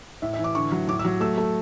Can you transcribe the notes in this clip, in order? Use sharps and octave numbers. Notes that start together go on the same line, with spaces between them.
A2 E5
E5
E3
D6
D3 C#6
F#3
A2 D6
E6
F#3
A3 E6
A3